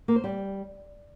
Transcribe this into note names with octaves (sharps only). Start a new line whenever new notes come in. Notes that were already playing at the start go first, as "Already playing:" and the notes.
A#3
C5
G3